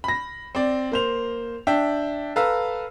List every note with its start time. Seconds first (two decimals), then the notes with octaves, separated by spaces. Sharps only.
0.04 B5 A#6
0.55 C4 D5
0.92 A#3 C5 F7
1.67 D4 E5 G5
2.36 A4 B4 F5 A#5 E6